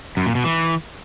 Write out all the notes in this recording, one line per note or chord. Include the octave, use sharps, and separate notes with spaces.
F#2
A#2
B2
E3